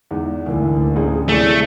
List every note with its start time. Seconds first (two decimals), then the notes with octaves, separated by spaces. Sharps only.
0.11 E2 G#2
0.46 D2 E3 A#3
0.96 A1 G#4
1.29 C3 A3 E4 G#4 D5